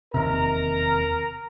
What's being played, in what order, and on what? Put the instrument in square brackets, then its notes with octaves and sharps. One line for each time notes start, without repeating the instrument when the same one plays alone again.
[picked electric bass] E1 D#2 C3 [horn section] A#4 A#5